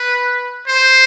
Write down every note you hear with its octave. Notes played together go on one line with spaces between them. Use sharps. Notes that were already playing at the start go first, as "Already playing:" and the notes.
Already playing: B4
C5